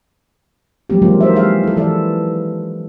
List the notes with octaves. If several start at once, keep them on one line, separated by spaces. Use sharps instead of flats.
F3 F#3 G#3 A#3 C4 G4
D#3 E3 G#3 A#3 D4 F4
A#4 C5 E5
G#3 G4 G#4 E5 F5
E4 A4
E3 A4 D5 E5